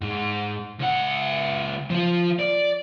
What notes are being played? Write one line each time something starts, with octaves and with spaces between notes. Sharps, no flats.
G#2
C#2 F#5
F3 F4
D5